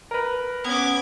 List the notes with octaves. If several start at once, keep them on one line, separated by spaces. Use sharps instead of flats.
A#4 B4
B3 C#4 D6 G#6